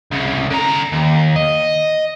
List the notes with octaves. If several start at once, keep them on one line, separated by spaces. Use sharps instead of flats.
C2 C#3
D3 A#5
D#2
D#5